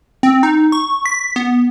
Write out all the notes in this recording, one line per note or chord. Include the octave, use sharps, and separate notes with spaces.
C4
D#4
C#6
B6
B3